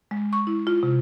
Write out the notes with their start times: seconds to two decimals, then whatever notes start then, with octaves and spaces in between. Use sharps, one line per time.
0.11 G#3
0.33 C#6
0.47 E4
0.67 F4
0.83 C3